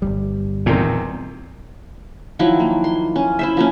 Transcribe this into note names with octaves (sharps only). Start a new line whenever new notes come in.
G1 D#2 G3
E2 A#2 D#3 C4
D#3 F3 F#3 E4
A#3
C6
C#4
E4 C5 E5
F3 A#3 C#4